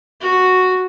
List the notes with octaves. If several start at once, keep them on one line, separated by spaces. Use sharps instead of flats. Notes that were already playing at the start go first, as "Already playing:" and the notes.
F#4